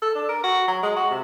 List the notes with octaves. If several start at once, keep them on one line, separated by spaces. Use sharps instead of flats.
A4
D4
A#4
F#4
F#3
G#3
F#4
C3